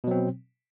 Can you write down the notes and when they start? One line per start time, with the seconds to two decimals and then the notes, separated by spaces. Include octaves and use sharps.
0.04 B2
0.07 F#3
0.11 C4